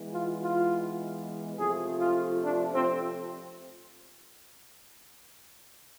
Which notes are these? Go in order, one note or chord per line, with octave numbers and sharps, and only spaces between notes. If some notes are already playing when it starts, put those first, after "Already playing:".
Already playing: E3 G#3 B3
F4
F4
C3 F3 A3 G#4
F4
D4
C4